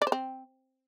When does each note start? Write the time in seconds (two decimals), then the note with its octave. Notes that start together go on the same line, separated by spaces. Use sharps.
0.02 D5
0.07 C5
0.12 C4